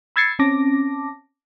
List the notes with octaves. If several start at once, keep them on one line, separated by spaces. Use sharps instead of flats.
B5 E6 G#6 A6 C7 C#7
C4 C#4 A5 D6 A#6